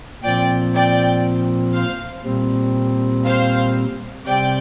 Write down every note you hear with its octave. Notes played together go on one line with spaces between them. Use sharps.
A#2 F3 C4 D5 G5
D5 G5
C5 F5
A#2 G3 C4
C5 F5
C3 G3 C4 D5 G5